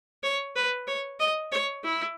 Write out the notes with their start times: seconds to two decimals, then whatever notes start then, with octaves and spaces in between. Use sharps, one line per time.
0.23 C#5
0.56 B4
0.88 C#5
1.20 D#5
1.52 C#5
1.84 E4